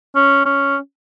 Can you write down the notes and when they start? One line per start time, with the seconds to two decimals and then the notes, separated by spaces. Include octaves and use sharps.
0.15 C#4
0.45 C#4